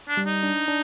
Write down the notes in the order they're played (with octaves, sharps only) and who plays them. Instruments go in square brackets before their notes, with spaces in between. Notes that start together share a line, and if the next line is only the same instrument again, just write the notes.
[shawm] D4
[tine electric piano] G3
[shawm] D#4
[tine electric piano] D4
D4